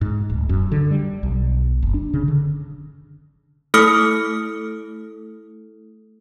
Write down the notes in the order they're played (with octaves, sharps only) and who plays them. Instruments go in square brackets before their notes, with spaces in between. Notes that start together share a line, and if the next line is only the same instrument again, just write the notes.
[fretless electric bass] G#2
D1
F#2
D3
G3
B1
F#1
D4
C#3
D3
[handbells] A3 E4 A4 D#6 F6 C#7